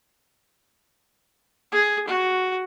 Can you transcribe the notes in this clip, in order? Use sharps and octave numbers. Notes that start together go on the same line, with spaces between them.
G#4
F#4